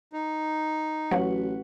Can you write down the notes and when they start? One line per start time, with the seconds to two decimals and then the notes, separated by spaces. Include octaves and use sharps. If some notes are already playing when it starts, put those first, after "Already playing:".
0.13 D#4
1.11 A1 F#3 F#4 B4 F#5